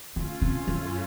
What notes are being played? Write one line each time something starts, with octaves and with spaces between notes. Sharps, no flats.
C#3 A3 C#4 F4
C3
F#2